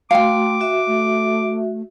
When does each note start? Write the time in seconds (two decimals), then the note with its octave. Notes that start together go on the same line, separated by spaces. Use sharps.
0.11 A3 F#4 F5 G5 C6 D6
0.61 F#4 E5
0.87 A3